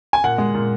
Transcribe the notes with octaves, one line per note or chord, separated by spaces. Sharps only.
G#5
A#2 F#5
G#3
A#2